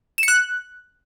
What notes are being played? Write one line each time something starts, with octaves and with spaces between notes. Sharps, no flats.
E7
C#7
F#6